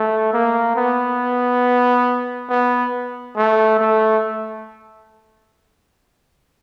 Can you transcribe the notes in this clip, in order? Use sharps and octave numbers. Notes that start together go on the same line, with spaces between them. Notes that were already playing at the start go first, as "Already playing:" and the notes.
Already playing: A3
A#3
B3
B3
A3
A3